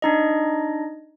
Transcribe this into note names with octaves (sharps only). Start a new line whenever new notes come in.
D4 D#4 D#5